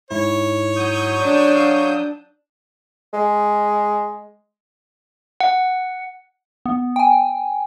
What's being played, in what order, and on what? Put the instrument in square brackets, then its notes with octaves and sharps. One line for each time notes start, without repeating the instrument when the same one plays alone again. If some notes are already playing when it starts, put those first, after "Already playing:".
[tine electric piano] G#2 E4 [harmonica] C#5
[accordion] F#3 D#6 G6
[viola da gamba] D4
[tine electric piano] F5
[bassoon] G#3
[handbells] F#5
[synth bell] B3
G5 G#5